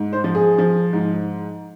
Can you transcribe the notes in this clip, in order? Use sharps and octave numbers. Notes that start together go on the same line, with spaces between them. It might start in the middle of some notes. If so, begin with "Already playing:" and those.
Already playing: G#2
C5
F3
G#4
F3
G#2